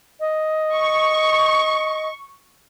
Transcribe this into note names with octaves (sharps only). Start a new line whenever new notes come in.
D#5
C#6